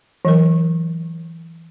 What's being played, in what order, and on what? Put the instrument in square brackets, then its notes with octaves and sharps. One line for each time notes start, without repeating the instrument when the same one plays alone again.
[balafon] E3 F#3 A#4